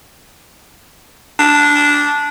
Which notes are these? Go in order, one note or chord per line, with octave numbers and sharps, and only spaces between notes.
D4